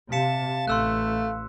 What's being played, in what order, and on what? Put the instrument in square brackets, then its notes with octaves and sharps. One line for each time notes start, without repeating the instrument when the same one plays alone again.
[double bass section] C3 [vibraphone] F5 [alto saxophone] A5 [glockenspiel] B6 C#7 E7
[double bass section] A1 [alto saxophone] A3 [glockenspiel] C6 E6 F#6